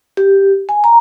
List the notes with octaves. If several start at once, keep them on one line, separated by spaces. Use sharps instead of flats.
G4
G#5
A#5